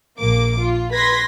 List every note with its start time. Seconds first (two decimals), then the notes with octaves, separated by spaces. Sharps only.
0.20 A#1 A#3 D6
0.61 F4
0.94 B4 C6 G#6 A#6 B6